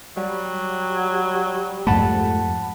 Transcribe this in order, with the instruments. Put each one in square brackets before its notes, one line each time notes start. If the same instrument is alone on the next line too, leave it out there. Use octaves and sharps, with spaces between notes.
[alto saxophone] F#3 [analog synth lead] G3
[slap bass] F2 G#2 A3 [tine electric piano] F#5 A5 B5